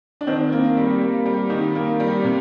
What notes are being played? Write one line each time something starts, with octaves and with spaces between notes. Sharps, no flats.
D4
D#3 C4
A#3
G3
A#3
G3
D#3
A#3
G3
C3